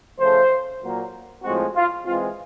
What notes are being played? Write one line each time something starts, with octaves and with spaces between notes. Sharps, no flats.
C#3 F3 A3 C5
A#2 F#3 A#3
A2 F3 G#3 C4 F#4
F4
E3 G#3 C4 F4